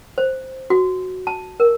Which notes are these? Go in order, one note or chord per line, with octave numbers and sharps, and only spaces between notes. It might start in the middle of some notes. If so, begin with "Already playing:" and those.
C5
F#4
A5
A#4